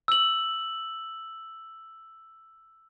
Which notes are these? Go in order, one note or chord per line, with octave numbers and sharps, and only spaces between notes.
E6 F#7